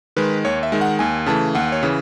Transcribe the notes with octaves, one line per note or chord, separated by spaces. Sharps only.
D#3 G#3 B4
D#2 C#5
E5
D#3 G#3
F#5
D#2 G#5
C#3 E3 A3 A5
D#2 F#5
C#5
C#3 E3